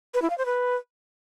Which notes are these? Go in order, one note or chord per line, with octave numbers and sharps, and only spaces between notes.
B4
E4
F5
C5
B4